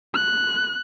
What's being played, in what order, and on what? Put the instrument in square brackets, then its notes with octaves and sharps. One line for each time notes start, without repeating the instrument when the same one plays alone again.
[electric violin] F#6